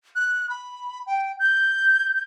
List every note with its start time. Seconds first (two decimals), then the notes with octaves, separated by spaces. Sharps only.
0.16 F#6
0.50 B5
1.06 G5
1.39 G6